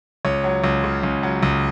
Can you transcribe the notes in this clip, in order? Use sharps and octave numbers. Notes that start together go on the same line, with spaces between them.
C#2 C#5
F#3
C#2
C#3
C#2
F#3
C#2